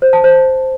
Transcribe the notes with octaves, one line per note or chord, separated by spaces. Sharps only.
C5
A5
C5